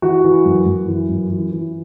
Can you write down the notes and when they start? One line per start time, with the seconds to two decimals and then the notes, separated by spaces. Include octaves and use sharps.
0.02 E3 F#4
0.24 E3
0.45 F#2
0.66 F#2
0.88 E3
1.09 F#2
1.31 E3
1.53 E3